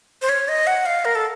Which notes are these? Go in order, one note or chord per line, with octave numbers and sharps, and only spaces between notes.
C5
C#5
D#5
F#5
F5
A#4
A4